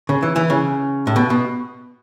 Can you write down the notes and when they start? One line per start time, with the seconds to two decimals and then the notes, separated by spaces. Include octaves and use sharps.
0.09 C#3
0.23 E3
0.36 E3
0.50 C#3
1.07 A2
1.16 B2
1.30 B2